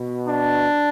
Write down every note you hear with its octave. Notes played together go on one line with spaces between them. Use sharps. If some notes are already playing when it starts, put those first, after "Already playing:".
Already playing: B2
D4